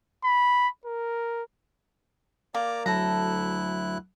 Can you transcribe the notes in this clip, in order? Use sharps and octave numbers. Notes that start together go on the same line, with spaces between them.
B5
A#4
A#3 D5 A#5 D6
D2 F#3 E4 A4 A#5 F#6